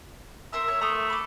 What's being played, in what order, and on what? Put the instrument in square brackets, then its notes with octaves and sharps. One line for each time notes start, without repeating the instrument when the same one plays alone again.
[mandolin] C4 A#4 E6 [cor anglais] E5
[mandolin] C#5
[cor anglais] A3 [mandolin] A#5 D#6
[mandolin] B5 D6